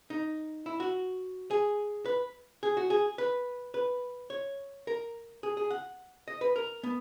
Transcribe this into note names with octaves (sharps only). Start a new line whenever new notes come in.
D#4
E4
F#4
G#4
B4
G#4
F#4
G#4
B4
B4
C#5
A#4
G#4
G#4
F#5
D#5
B4
A#4
B3